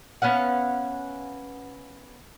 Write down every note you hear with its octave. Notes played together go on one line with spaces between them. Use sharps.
B3 C#4 F5 F#5